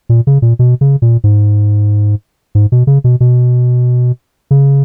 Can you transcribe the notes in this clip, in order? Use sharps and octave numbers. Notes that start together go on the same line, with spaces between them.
A#2
C#3
A#2
B2
C#3
A#2
G#2
G#2
B2
C#3
B2
B2
C#3